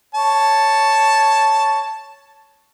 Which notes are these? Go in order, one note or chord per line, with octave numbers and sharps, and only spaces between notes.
C#5 A5